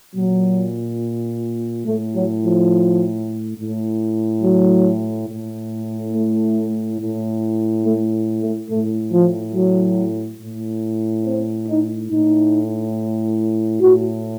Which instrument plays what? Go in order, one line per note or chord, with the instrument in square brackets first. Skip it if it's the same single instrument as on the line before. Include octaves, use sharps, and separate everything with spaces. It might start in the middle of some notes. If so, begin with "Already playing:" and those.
[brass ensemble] A#2 F#3
A2 A3
F#3
F3
A2
F#3
A2
A3
A2
A3
A3
A2 A3
F3
F#3
A2
C4
D#4
A2 D#4
A2 F#4